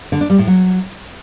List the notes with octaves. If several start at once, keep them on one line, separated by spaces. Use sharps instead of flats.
D3
D4
G3
A2
F#3